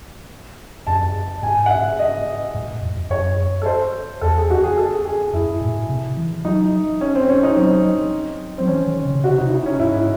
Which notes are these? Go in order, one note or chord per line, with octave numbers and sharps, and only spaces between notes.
F#2 A5
G#2 G#5
F#5
E5
D#5
G#2
A2
F#2
F#2
F#2 C#5
A4
C5
E2 A4
G#4
F#4
G#4
A4
G#4
F#2 E4
A2
C3
E3
F#3 D#4
C#4
C4
C#4
D#4
F#3 C4
F#3 C4
E3 C#4
D#3
C#3
C#3
C3 F#4
D#4
E4
D#4
C#4
G#2 E4